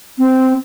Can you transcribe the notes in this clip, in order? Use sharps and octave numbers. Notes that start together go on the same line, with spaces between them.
C4